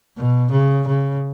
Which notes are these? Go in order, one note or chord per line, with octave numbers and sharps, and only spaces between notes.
B2
C#3
C#3